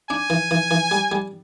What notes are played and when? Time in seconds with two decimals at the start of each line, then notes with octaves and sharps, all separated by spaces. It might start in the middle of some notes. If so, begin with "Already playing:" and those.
0.10 D4 G#5
0.30 E3
0.51 E3
0.71 E3
0.91 G3
1.12 G3